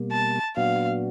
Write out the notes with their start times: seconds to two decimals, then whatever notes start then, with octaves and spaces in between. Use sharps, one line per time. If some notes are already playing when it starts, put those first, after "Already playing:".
Already playing: B2 G3 A#3
0.12 A5
0.56 A#2 F#3 B3 D4 F#4 F5